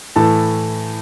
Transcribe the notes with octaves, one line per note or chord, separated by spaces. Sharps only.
A2 E3 A3 A4 A5